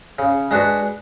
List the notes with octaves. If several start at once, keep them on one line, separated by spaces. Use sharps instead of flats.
C#3
G#3 D4 F#4 B4